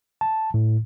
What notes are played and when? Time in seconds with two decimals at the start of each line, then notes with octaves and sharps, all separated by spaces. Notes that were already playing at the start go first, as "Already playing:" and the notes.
0.21 A5
0.54 A2